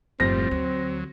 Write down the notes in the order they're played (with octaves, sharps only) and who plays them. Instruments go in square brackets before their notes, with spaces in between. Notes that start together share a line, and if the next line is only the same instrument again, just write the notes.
[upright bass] F#1 [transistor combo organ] A2 F3 G3 [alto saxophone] C4 [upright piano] A#6
[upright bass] D2 [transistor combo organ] F#3